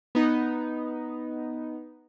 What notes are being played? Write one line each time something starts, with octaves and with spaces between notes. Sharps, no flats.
B3 D#4